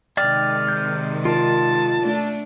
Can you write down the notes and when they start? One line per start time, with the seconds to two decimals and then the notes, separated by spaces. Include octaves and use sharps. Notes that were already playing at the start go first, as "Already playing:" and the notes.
0.17 C3 D#3 G#3 D5 G5 F6
0.69 G6
1.25 F4 A#4 A5
2.01 A3 D4